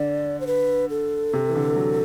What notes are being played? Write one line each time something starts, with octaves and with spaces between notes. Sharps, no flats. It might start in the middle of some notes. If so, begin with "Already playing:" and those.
Already playing: D3 D5
C5
B4
A4
C3
E3
D3
F#3